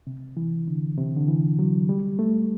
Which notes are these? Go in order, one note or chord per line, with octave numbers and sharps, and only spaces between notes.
C3
E3
D3
C3
D3
E3
F#3
G3
A3